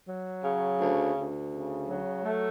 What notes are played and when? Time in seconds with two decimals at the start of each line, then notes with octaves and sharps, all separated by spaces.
0.08 F#3
0.44 C#3
0.80 D2
1.16 D2
1.52 C#3
1.88 F#3
2.24 A3